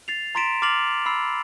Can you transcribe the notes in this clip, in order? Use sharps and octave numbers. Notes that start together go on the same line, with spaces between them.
A6 C7 F7
A#5 C6 A6 B6 D7 E7
D6 F6 A6 C7 F7 F#7
B5 E6 C7